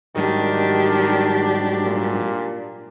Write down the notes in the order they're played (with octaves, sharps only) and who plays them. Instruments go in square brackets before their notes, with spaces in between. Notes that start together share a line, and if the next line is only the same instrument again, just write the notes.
[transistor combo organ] G#2 F#3 G3 [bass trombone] D#3 [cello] D4 G4
[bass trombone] A#2